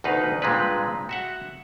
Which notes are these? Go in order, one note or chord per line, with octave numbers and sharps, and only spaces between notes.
D2 B2 D#3 D#4 B4 F5
G2 A#2 G#3 C4 B4
F#4 E5 F#5